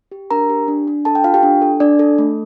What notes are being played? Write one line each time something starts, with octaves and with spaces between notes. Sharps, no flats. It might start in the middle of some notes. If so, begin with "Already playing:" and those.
G4
D4 A#4 A#5
G4
D4
D4
A4 A5
G5
F4 F5
G4 G5
D4
A4
D4 D5
A4
A3